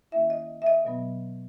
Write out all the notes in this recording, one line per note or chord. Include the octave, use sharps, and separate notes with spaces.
D#3 A#3 C#4 E4 E5
D#5
E5
D#5
B2 F#3 B3